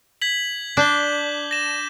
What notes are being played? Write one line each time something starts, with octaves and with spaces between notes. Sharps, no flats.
G#6 B6 F#7
D4 D6 G6 G7
A#6 E7